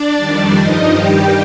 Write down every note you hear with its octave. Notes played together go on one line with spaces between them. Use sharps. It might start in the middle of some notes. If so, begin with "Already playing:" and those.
Already playing: D4 D5
F2 D#3 G3
G2 F3 D#4 D#5
G2 D#3 G3 G4 G5